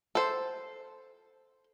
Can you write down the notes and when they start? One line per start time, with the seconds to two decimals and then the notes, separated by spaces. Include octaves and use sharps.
0.15 A4 C5